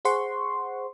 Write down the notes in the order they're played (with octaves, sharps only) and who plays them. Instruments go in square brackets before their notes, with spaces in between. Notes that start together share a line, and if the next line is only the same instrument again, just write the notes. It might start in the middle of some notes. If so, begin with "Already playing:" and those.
[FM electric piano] G#4 C5 F#5 C6 C#6